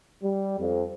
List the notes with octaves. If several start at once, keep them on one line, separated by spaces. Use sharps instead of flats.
G3
F2